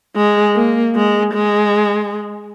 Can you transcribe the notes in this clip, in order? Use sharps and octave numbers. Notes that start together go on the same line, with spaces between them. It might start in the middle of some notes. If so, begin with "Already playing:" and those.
G#3
A#3
G#3
G#3